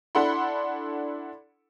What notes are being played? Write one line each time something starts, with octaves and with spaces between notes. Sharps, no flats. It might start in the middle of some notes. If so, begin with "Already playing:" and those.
D4 E4 A4 F#5 B5 C6